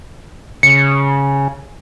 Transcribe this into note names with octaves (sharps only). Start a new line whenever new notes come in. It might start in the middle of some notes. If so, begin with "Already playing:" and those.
C#3 C#7